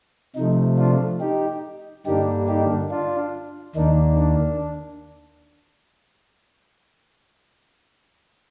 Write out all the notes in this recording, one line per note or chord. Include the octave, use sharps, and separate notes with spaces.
C3 F3 A3 D#4
D4 F4
D#4 G4
G2 D3 G3 A#3 D4 D#4 G4
D#4 G4
D4 F4
D#2 D#3 A#3 D4 D#4
D4